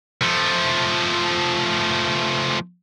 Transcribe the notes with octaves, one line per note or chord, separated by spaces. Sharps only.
F3 A3